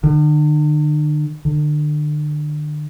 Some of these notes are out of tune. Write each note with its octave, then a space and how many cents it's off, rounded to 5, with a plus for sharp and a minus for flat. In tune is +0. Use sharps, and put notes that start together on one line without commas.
D3 +45
D3 +35